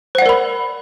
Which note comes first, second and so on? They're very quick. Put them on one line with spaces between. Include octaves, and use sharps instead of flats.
C5 F#5 D5 A#4 B5